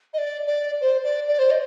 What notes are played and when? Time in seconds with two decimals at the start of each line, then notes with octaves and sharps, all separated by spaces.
0.13 D#5
0.18 D5
0.47 D5
0.81 C5
1.04 D5
1.28 D5
1.39 C5
1.51 D#5